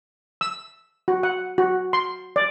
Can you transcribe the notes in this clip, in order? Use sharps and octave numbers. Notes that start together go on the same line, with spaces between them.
E6
F#4
F#5
F#4
C6
D5